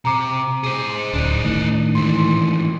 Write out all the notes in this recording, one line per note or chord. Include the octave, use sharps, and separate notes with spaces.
C3 A#5 D6
G#4 C5
D1 D4 D#4
A2 D#3
G#2 E3 C6